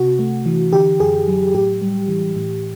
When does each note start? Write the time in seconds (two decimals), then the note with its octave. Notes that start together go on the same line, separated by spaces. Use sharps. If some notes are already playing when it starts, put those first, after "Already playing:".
Already playing: C3 F#4
0.19 A3
0.46 E3
0.73 D3 G4
1.00 F#2 G#4
1.28 F#3
1.54 A2 G4
1.82 G3
2.08 E3
2.36 A2